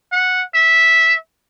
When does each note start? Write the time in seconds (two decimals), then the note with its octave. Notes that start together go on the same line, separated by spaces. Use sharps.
0.12 F#5
0.54 E5